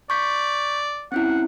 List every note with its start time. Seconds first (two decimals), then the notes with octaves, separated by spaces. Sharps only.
0.10 D5 C#6 G6 B6
1.12 C4 C#4 E4 F#5